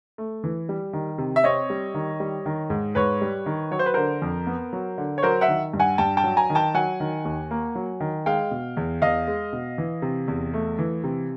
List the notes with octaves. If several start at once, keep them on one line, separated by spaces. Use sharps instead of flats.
A3
E3
G3
D#3
C3
E5
C4 C#5 D#5
G3
D#3
G3
D#3
G#2
G#2 B4 C#5
G3
D#3
F#3 C#5
C5
B4
D3 A#4 C5
F2
B3
F#3
D3
C#5
F#3 A#4 C5
E5 F#5
D#3
G2
F#5 G#5
G2 G5 A5
G5 A5
F#3
G#5 A#5
D#3
G5 A5
F#3 F#5 G#5
D#3
D#2
A#3
F#3
D#3
G#3 F5 G5
B2
E2
E2 D#5 F5
G#3
B2
E3
C3
E2
A3
E3
C3